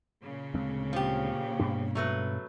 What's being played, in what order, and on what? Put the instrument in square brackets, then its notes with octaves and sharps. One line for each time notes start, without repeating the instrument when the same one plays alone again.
[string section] A#2 C#3
[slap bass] D2 G#3 C4
[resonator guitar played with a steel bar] F3 G4
[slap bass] G2 B2 D4
[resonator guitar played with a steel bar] F#3 A3 B4